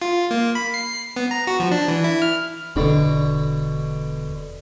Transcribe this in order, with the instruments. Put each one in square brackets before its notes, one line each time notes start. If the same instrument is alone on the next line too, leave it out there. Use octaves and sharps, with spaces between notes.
[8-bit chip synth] F4
A#3
B5
C7
B3
A#5
F#4
F3
D4
E3
E4
F6
[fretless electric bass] E1 D4 [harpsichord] B2 D3